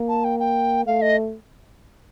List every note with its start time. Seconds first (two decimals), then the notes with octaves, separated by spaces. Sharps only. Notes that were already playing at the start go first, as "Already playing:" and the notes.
Already playing: A#3
0.08 A5
0.24 G5
0.40 G5
0.86 A3 F5
1.02 D#5